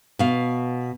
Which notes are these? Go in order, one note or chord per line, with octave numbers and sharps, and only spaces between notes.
B2 F5